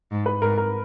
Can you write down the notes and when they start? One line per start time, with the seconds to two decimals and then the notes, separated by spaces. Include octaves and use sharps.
0.12 G#2
0.26 B4
0.42 G#2 A#4
0.58 A#4